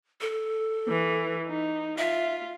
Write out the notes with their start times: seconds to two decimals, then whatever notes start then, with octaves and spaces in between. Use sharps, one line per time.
0.21 A4
0.88 E3
1.47 D#4
1.98 F4 E5